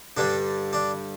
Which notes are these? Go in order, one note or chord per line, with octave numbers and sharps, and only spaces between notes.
G2 D3 G3 D4
D4